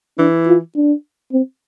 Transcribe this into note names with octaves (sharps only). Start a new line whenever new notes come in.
E3 D4
F4
D4
C4